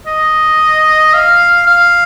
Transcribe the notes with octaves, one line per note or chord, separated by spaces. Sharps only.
D#5
F5
F5